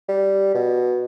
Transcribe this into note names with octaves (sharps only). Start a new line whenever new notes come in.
G3
B2